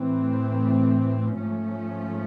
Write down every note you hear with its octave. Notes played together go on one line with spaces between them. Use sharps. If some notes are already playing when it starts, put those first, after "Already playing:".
Already playing: A2 E3 A3 C4
G#2 F3 A3 C#4